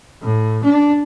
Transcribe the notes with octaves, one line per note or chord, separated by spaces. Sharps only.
A2
D4